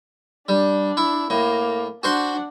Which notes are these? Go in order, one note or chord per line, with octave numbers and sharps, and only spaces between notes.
G3 D4
E4
A2 A#3
D4 F#4 C5 F#5 C6